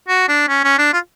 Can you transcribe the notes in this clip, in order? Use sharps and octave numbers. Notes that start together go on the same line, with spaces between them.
F#4
D4
C#4
C#4
D4
F4